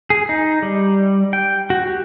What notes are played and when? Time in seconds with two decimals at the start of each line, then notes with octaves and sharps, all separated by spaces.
0.10 G#4
0.29 D#4
0.62 G3
1.33 G5
1.70 F#4
1.88 G4